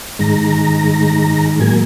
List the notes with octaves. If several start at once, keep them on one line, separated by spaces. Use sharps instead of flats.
G#2 D#3 G#3 A#5
A2 F#3 A#3 G#5